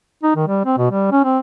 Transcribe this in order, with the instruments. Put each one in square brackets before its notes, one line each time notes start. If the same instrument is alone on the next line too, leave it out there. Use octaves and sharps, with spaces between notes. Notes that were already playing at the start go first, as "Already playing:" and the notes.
[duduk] D#4
D#3
G3
C4
B2
G3
C#4
C4